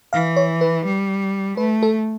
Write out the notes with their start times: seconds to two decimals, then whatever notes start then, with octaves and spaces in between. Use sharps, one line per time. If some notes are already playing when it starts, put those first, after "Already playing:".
0.13 E3 F5
0.36 C#5
0.61 B4
0.86 G3
1.57 A3 B4
1.83 A4